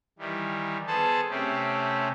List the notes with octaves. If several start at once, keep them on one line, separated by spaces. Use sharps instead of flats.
D#3 E3 G3
B3 G#4 A4 C5 A5
C3 A3 C4 C#4 G4